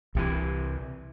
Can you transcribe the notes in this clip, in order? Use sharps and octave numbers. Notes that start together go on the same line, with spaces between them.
C2 C3 E3